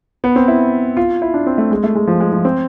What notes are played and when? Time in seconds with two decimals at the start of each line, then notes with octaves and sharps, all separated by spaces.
0.24 B3
0.36 C4
0.48 E4
0.97 F4
1.22 E4
1.34 D4
1.46 C4
1.58 A3
1.71 G#3
1.84 A3
1.95 G#3
2.07 F3
2.20 G#3
2.33 F3
2.45 C4